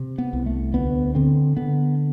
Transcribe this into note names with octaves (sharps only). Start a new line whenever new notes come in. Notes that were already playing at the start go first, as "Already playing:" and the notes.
Already playing: C3
B3
C2
A3
D2 B3
D3 C4
D3 B3